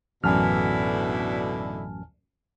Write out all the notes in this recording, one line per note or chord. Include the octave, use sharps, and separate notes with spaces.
A1 F#2 B2 D3 E4 G#5 A5 F6